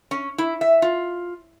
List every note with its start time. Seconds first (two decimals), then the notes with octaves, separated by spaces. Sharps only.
0.11 C#4
0.38 E4
0.61 E5
0.82 F4